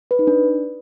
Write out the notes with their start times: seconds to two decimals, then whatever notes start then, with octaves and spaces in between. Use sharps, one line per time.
0.11 B4
0.19 D#4
0.27 D4